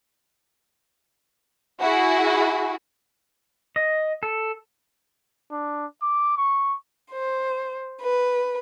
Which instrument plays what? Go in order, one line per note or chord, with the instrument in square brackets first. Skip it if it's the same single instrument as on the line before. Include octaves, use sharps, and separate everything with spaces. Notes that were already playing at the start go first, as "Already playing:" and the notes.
[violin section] E4 F#4 G#4
[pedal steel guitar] D#5
A4
[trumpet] D4
D6
C#6
[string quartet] C5
B4